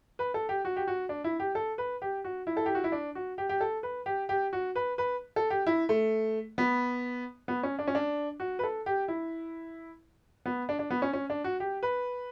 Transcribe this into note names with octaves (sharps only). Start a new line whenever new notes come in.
B4
A4
G4
F#4
G4
F#4
D4
E4
G4
A4
B4
G4
F#4
E4
A4
G4
F#4
E4
D4
F#4
G4
G4
A4
B4
G4
G4
F#4
B4
B4
A4
G4
E4
A3
B3
B3
C#4
D4
C#4
D4
F#4
B4
A4
G4
E4
B3
D4
D4
B3
C#4
C#4
D4
F#4
G4
B4